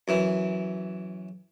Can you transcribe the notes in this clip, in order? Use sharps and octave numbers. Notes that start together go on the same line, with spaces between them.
F#2 E3